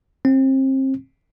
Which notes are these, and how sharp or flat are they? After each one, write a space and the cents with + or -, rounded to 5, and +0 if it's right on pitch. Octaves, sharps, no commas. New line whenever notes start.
C4 +30